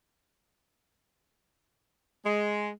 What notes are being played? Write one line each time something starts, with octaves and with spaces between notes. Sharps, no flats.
G#3